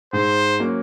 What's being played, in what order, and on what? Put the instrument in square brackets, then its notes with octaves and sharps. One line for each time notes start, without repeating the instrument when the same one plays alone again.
[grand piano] G#2 [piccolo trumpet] C5
[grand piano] F#3 A#3 C#4